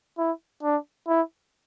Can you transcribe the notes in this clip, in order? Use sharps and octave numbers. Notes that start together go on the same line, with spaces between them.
E4
D4
E4